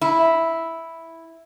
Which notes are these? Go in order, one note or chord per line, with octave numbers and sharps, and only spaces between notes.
E4